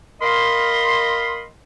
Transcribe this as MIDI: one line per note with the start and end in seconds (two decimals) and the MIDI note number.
0.22 1.43 70
0.22 1.43 75
0.22 1.43 77
0.22 1.43 83
0.22 1.43 84